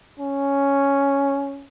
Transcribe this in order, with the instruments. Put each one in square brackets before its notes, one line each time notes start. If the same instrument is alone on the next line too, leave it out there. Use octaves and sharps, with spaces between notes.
[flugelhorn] C#4